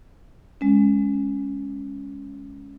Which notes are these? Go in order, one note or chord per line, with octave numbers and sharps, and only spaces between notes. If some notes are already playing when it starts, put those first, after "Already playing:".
G#3 C#4